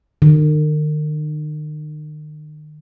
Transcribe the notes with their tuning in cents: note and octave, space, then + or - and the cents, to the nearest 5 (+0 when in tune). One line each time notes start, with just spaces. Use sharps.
D#3 -40